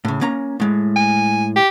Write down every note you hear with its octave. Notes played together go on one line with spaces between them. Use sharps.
A2 C#3
A#3 C#4 A#5
A2 G#3
G#5
G4